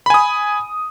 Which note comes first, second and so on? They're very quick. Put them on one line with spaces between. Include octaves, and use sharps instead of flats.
B5 G#5 D#6